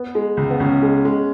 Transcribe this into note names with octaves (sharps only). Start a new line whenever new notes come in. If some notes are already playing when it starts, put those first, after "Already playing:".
Already playing: B3
G#3
C#2
B3
C#2 C#4
G#3
G#3